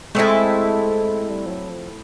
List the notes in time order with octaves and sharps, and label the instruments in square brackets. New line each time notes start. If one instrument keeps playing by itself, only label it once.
[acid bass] G#3 [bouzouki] A3 C4 E4 A4
[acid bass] G3
F3
F#3
F3